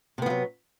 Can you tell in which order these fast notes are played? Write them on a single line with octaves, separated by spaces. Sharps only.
C3 B3 F3 F#3